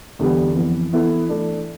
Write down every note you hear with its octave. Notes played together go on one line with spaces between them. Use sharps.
E2 D3 G3 B3
F2 E3 B3
E3 B3 E4 A4
E3 A3 D4